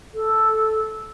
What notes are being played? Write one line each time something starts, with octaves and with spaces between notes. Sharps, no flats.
A4